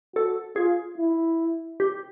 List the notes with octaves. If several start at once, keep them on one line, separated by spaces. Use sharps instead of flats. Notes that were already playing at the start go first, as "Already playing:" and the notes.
F#4 A4
F4 G#4
E4
G4